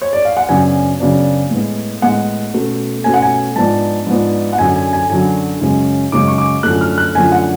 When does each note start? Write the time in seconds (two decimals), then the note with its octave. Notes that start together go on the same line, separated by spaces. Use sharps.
0.02 C#5
0.13 D5
0.25 F5
0.37 F#5
0.48 F#2 C#3 F#3 B3 D4 G#5
1.00 F#2 C#3 F#3 B3 D4
1.51 A2 G#3 B3
2.02 A2 G#3 B3 F#5
2.54 B2 A3 C#4
3.04 B2 A3 C#4 G#5
3.14 F#5
3.22 G#5
3.56 G#2 F3 B3 D4 A5
4.07 G#2 F3 B3 D4
4.53 F#5
4.58 F#2 D3 F#3 G#5
4.76 G#5
4.93 G#5
5.10 F#2 D3 F#3 G#5
5.61 F#2 C#3 G#3 C#4
6.12 F#2 C#3 G#3 C#4 D6
6.28 C#6
6.38 D6
6.63 F#2 D3 F3 A3 F#6
6.81 F6
6.98 F#6
7.15 F#2 D3 F3 A3 G#5
7.32 F#5